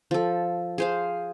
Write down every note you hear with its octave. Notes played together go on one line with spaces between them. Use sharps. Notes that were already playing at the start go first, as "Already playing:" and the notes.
F3 A4
G#4 C5 F5